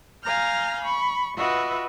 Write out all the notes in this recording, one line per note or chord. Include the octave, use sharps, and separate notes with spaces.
F5 G#5 A#5 F6 G6
B5 C#6
F4 F#4 B4 D#5 E5